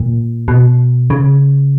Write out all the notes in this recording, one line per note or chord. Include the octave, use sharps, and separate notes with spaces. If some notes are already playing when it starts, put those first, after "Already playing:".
Already playing: A#2
B2
C#3